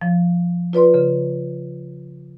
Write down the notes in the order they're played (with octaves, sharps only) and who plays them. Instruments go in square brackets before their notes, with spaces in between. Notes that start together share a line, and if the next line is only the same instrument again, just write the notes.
[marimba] F3
F4 B4 D5 C6
C#3